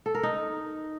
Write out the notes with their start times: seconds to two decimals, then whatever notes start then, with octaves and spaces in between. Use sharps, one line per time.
0.06 A4
0.15 A#4
0.23 D#4